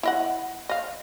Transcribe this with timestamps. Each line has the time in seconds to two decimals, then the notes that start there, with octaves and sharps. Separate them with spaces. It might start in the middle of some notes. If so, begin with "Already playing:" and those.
0.03 E4 D#5 F#5
0.69 D#5 F5